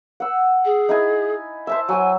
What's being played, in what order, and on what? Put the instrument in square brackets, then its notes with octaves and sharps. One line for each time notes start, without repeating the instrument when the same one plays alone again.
[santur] F#5 E6
[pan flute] G#4
[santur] D#4 E4 G#5
[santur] C5 A5 E6 [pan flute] E5
[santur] F#3 G5 [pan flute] G#5